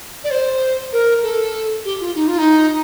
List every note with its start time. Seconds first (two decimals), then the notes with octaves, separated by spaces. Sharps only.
0.24 D5
0.31 C5
0.92 A#4
1.23 A4
1.85 G4
2.00 F4
2.15 D#4
2.28 F4
2.38 D#4